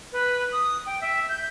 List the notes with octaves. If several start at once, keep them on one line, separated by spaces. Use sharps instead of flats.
B4
D#6
G5
E5
G6